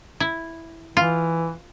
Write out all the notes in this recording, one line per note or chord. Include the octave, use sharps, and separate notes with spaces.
E4
E3 F4